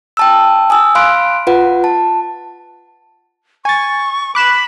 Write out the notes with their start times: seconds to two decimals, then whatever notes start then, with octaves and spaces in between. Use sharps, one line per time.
0.17 G5 A5 E6
0.70 G#5 D#6 E6
0.95 F5 B5 C6 F6 F#6 D7
1.47 F4 B4 F#5
1.84 A5
3.65 G#5 C#6 A6
4.35 B5 D6 F#6 E7